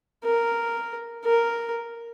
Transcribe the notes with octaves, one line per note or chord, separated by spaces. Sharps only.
A#4
A#4